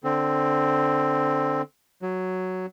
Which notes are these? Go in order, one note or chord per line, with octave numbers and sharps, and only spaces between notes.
D3 C4
F#3